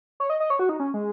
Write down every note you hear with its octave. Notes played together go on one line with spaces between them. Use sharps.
C#5
D#5
D#5
C#5
F#4
D#4
C#4
G#3